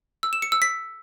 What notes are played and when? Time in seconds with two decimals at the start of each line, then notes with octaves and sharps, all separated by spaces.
0.23 E6
0.33 E7
0.42 C#7
0.52 E6
0.62 B6